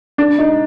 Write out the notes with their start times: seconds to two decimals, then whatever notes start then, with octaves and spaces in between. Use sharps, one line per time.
0.18 D4
0.39 D#4